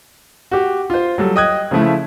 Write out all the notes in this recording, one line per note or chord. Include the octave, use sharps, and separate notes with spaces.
F#4 G4
F4 C5
F#3 G3 A4
D#5 G5 D#6 F#6 G#6
C#3 F3 A3 E4